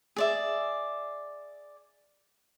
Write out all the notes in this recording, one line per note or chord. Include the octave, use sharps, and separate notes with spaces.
G#4 D5 E5